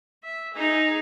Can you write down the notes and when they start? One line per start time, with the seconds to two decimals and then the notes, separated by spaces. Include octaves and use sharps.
0.24 E5
0.54 D#4 G#4